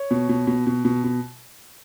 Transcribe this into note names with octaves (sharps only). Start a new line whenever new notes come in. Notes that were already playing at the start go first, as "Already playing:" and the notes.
Already playing: C#5
B2
B2
B2
B2
B2
B2